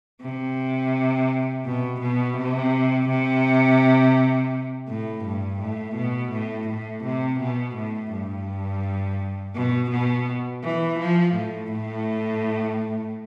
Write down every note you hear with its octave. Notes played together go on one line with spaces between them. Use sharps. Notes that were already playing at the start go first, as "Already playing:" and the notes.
C3
B2
B2
C3
C3
A2
G2
A2
B2
A2
A2
C3
B2
A2
G2
B2
B2
E3
F3
A2
A2